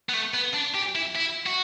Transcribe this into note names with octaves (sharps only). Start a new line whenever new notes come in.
B3
A3
B3
D4
G4
E4
E4
F#4